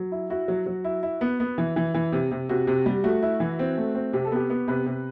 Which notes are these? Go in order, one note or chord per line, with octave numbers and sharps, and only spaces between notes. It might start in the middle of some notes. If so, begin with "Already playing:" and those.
Already playing: F#3
E4
E4 F#4
F#3
F#3
E4
E4
B3
B3
E3
E3
E3
C3
C3
C3 F#4
C3
G3
A3 F#4
E4
E3
C4
A3
C4
C3 G4
A4
B3 G4
B3
C3 B4
C3